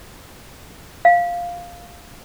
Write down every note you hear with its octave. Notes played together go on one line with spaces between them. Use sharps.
F5